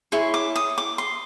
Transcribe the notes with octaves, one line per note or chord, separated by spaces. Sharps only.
E4 G#4 C#5 C6
D6
D#6
D6
C6